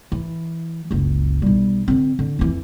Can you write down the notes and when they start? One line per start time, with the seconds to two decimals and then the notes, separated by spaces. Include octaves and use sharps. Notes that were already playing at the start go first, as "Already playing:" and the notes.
0.12 E3
0.91 F#1 C#2
1.42 B1 G3
1.88 D3 C4
2.19 D3
2.39 F2 E3